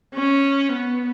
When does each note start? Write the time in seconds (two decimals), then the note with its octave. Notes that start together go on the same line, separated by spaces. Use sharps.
0.16 C#4
0.76 B3